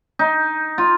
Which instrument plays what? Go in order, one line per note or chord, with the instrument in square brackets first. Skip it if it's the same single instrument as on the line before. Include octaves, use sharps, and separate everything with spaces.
[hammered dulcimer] D#4
F4